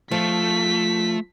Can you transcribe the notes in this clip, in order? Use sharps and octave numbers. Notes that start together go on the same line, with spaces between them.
F3 A3 B6